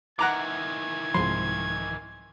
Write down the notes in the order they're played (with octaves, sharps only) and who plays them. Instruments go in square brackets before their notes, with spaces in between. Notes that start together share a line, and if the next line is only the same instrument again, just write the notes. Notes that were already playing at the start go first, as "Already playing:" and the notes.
[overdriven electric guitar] D#3 E3 [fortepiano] F#5 A#5 D6 [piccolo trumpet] G#6
[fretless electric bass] C2 G#2 F3 [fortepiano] C6